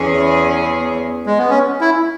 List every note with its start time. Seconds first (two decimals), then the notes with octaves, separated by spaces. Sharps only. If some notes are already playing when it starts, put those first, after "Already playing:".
Already playing: E2 E3 C#4 G#4
1.26 G#3
1.38 B3
1.50 C#4
1.81 E4